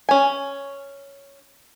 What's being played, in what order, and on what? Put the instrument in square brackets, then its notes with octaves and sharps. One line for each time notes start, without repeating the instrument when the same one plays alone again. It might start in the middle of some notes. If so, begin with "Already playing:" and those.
[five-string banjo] C#4 G#5